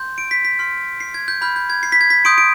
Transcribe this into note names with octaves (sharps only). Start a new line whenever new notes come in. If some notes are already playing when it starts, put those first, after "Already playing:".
Already playing: C6 G6
D7
B6
B6
C6 F6
C7
G#6
G6
B5 F6 G6
G6
G#6
C7
B6
G#6
B6
C6 D#6 G6 D7
D7